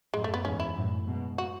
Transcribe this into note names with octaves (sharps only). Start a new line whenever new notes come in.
F#2 A2 G#3
A3
B3
E2 G#2 C#4
E4
F#2 A2
G#2 B2
F#4